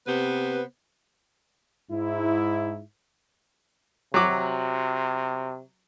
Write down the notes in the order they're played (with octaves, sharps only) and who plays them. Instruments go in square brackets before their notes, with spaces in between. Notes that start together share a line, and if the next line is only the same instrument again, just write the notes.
[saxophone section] C3 B3 B4 C5
[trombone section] G#2 E4
[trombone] C3 [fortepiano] F#3 F#4 D6